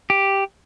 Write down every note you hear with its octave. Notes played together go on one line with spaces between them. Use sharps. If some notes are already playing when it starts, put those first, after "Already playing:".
G4